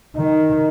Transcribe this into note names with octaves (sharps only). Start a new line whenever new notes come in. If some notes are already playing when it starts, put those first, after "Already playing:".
D#3